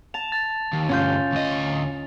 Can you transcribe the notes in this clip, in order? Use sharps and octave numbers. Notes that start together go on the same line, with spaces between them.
A5 F7
A6
D#2
D2 G2 C#4 F4 G6
D2 D#5